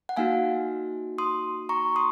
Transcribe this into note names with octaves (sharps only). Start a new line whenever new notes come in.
F#5
A#3 D#4 F#4 F5 G#5
C6 D#6
A#5 C#6
C6 D#6